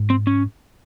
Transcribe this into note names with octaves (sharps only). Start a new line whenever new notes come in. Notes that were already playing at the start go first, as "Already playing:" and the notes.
Already playing: G#2
C4
C#4